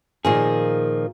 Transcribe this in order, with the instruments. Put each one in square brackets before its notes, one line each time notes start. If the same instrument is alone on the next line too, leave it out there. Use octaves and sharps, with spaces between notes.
[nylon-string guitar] A#2 D#3 F3 [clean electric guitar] G#4